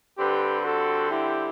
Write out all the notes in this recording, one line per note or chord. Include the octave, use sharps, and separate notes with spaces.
D3 G3 C4 G4 B4
F#4 A4
E4 G4